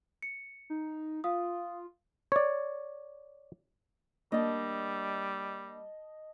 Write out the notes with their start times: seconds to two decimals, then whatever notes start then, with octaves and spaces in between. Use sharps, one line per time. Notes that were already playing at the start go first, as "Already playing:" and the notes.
0.22 C#7
0.70 D#4
1.24 F4 F5 D#6
2.32 C#5 D5
4.32 G3 A#3 D4 D#5 A5